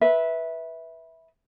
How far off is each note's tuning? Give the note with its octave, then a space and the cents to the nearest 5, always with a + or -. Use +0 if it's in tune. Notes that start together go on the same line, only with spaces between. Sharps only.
B4 -10 E5 -15